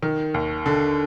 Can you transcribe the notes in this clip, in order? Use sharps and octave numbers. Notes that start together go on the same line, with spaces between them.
D#3
D#2
D3